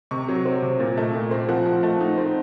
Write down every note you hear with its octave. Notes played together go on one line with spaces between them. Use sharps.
C3 C#6
F#3
C4
C3
A#2
A3
A#2
C4
F3 F#5
F3
A3
D#4
C4